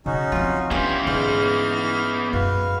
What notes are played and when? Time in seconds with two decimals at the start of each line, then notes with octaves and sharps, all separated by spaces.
0.06 C#3 C#4 D#4 F#4
0.32 F3 C4 F4
0.71 B3 C#4 D4 F4 G4 G#4
1.07 G#2 D3 F6
2.33 F#2 F#4 B4 F5